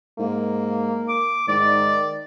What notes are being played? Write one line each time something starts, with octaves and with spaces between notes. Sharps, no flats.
G#2 A#3
D6
G#2 D#3 D5